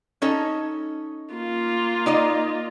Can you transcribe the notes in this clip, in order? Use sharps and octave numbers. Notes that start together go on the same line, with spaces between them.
C#4 D#4 A4
A#3 F4
D#4 D5 D#5